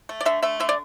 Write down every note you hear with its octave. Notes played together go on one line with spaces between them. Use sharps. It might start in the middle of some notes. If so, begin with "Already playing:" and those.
A3
D5
D3 E5
A3 E5
D3 E5
D5